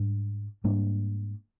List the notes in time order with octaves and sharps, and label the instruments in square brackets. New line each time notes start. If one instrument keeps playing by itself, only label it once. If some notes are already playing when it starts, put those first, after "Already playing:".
Already playing: [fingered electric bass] G#2 G3 D4
G#2 G3 A#3 D4